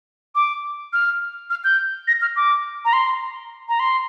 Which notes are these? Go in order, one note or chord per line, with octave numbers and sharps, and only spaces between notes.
D6
F6
F6
G6
A#6
F6
D6
A#5
C6
A#5
C6